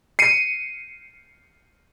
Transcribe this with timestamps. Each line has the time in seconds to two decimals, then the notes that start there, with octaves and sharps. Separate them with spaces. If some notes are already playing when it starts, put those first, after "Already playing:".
0.19 C7 C#7 D#7